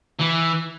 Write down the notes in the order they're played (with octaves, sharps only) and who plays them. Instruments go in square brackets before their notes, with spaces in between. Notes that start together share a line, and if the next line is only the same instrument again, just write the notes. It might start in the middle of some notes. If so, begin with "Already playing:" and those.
[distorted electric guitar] E3